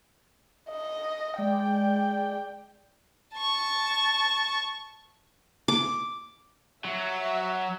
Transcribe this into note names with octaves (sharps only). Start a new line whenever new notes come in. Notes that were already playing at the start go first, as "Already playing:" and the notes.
D#5
G#3 D5 G5
A5 C#6
D6
F#3 E5